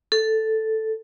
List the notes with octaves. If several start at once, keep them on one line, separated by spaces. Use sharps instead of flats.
A4